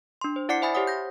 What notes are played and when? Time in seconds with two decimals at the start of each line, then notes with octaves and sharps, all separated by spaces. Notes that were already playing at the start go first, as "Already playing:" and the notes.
0.21 D4 C6
0.36 C5
0.49 E4 D5 F#5 D6 C7 C#7
0.62 C5 E5 G#5 B5 D#6 A6
0.74 G4 C5 C#5 F#5 D#6
0.87 G6 A#6